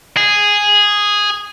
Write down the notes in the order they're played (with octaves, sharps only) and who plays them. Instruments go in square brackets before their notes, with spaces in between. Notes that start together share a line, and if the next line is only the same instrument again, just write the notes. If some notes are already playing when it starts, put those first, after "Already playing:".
[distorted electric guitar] G#4